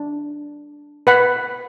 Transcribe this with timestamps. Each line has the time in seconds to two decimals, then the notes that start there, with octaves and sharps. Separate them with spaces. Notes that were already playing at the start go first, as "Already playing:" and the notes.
Already playing: D4
1.07 B4 F#5 B5